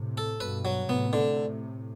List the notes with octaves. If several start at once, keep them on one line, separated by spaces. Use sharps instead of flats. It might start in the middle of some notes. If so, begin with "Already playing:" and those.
Already playing: A2 C3
A4
G2 B2 B4
F#3
A2 C3 B3
D3